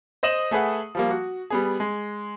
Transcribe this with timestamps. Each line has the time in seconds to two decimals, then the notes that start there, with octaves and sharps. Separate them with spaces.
0.23 C5 D#5 D#6 E7 F#7
0.51 A3 G#4 B4 F#5
0.95 F3 G3 A#3
1.10 F#4
1.50 G3 B3 G#4
1.80 G#3